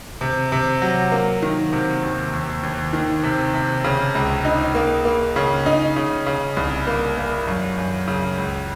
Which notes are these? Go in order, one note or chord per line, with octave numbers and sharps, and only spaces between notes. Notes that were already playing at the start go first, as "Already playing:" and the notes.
C3
C3
F#3
A#3
D#3
C3
D#2
D#2
D#2
D#3
C3
C3
C#3
C#2
D#4
A#3
A#3
C#3
D#4
C#3
C#3
C2
A#3
A#3
F#2
F#2
C#3
C#2